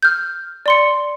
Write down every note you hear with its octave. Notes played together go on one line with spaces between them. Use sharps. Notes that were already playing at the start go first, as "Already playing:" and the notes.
F6 G6
D5 C6 C#7